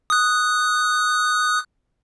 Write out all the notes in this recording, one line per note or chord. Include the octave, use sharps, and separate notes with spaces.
D#6 F#6